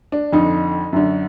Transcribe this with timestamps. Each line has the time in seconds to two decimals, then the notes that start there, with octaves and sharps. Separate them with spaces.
0.12 D4
0.32 F2 D3 D#4
0.93 F#2 D3